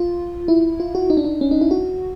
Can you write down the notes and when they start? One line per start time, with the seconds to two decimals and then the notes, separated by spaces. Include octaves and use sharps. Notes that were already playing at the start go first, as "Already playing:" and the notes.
Already playing: F4
0.48 E4
0.80 F4
0.95 F#4
1.10 D#4
1.17 D4
1.25 D#4
1.41 C#4
1.51 D#4
1.61 E4
1.71 F#4